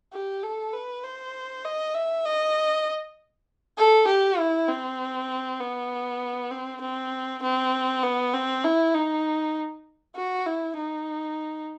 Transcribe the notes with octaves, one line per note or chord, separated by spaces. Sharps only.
G4
A4
B4
C5
D#5
E5
D#5
A4
G4
E4
C4
B3
C4
C4
C4
B3
C4
E4
D#4
F#4
E4
D#4